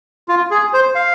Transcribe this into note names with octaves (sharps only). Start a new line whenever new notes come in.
F4
G#4
C5
F5